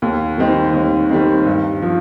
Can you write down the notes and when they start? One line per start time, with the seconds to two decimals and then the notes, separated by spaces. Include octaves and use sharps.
0.02 D#2
0.38 D#3 G3 C4 D#4
0.73 D#2
1.09 D#3 G3 C4 D#4
1.46 G2
1.82 F3